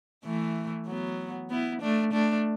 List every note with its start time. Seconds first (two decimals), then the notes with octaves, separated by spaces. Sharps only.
0.24 E3 A3
0.87 F#3 B3
1.50 B3 E4
1.82 A3 D4
2.13 A3 D4